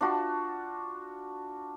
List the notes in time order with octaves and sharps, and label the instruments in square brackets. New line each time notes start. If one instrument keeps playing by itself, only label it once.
[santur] D4 F4 F#4 A5